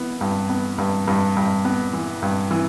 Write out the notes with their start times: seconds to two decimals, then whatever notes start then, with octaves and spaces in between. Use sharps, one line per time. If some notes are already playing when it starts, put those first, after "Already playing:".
Already playing: E3 B3
0.21 G2
0.50 B3
0.78 G2
1.08 G2
1.37 G2
1.65 B3
1.93 E3
2.22 G2
2.51 E3